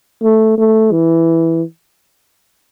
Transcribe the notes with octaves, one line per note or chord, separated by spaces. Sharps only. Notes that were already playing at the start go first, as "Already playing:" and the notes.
A3
A3
E3